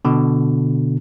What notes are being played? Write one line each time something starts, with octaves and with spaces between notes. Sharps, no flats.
B2 D3